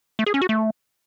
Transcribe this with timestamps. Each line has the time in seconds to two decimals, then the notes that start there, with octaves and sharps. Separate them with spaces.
0.19 A3
0.26 G#4
0.34 C#4
0.42 F#4
0.49 A3